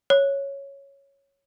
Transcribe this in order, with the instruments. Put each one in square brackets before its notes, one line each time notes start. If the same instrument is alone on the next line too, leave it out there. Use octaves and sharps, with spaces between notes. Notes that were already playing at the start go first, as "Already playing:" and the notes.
[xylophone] C#5